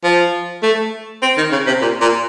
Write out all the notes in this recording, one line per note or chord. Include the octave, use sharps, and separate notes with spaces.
F3
A3
C4
D#3
C#3
C3
A#2
A#2